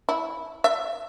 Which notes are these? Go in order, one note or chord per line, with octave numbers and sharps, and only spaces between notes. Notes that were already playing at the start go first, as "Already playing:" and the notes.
E4
E5